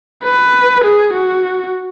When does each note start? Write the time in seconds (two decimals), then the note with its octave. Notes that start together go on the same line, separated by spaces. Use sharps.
0.24 B4
0.84 G#4
1.13 F#4